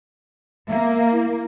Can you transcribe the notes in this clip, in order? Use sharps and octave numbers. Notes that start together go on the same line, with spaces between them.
A#3 E5
E4